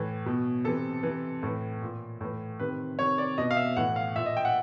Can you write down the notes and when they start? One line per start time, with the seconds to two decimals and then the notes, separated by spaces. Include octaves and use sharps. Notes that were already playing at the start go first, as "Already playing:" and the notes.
Already playing: A2 E3
0.26 B2
0.64 C3 E3 A4
1.03 C3 E3
1.43 A2 E3
1.82 A#2
2.21 A2 E3
2.60 C3 D#3 B4
2.99 C3 D#3 C#5
3.18 D5
3.38 B2 D#5
3.51 F5
3.57 E5
3.77 A2 E3 F#5
3.96 F5
4.16 A#2 E5
4.26 D#5
4.37 G5
4.45 F#5